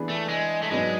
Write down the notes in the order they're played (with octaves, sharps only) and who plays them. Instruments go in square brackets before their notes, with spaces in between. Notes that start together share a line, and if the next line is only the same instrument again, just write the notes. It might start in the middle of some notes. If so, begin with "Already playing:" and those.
Already playing: [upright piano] E3 B3 D4 G#4 B4
[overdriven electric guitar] A3
G#3
A3
[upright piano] G#2 F#3 B3 D4 [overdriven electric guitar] G#3